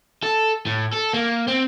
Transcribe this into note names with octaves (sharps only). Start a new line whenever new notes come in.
A4
A2
A4
A#3
C4